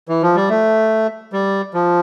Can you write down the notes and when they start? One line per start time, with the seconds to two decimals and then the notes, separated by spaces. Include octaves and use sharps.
0.09 E3
0.22 F3
0.36 G3
0.49 A3
1.33 G3
1.74 F3